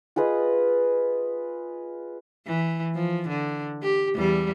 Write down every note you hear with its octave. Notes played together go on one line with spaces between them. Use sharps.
F4 G#4 B4 D#5
E3
F3
D3
G4
E2 G3